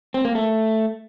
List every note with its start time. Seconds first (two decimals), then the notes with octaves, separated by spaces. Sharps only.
0.14 C4
0.25 A#3
0.35 A3